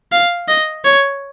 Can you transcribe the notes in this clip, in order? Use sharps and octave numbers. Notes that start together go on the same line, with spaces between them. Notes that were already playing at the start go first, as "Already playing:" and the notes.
F5
D#5
C#5